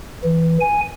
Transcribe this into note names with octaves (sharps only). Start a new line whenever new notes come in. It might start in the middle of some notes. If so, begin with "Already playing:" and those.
E3
G#5